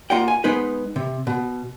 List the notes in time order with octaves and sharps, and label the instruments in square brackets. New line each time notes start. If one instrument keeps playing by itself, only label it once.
[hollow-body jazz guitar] A#3 F4 D#5 F#5 G5
G#5
G#3 B3 D#4 B4 C5
C3
B2